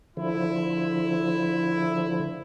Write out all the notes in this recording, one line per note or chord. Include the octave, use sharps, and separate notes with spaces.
D3 F3 E4